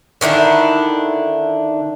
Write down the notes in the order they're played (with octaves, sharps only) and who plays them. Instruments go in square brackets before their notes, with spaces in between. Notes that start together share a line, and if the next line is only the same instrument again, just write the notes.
[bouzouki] D3 D#3 D4 E4